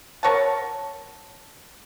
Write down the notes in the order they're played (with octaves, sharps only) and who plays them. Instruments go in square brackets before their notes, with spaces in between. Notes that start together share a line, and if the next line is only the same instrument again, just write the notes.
[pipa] A#4 C#5 F#5 A5